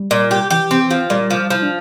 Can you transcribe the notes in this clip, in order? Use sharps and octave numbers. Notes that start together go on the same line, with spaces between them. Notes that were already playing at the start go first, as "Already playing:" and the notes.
Already playing: G3
A#2
G4
E3 G4
C4
F3
A#2 G3
F3
F3 E4
D4